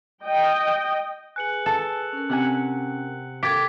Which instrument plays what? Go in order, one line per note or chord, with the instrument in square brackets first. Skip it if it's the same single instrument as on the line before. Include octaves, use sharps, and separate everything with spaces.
[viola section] D#5 G5
[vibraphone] G#4 B4 G#5 [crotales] F#6 C#7 F#7
[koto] A4
[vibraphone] C#4 A#4
[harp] C3 F#5 G#5
[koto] G4 [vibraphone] A4 A#4 [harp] D6 [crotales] G#6 A6 B6